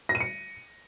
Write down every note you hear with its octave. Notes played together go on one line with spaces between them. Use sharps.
A#6
D#7
C#7